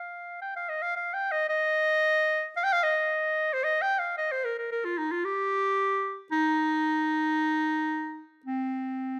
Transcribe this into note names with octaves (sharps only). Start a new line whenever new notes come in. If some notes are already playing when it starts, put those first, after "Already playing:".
Already playing: F5
G5
F5
D#5
F5
F5
G5
D#5
D#5
F5
G5
F5
D#5
C5
D#5
G5
F5
D#5
C5
A#4
A#4
A#4
F4
D#4
F4
G4
D#4
C4